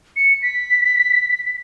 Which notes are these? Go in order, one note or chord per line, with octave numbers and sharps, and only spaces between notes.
C#7
B6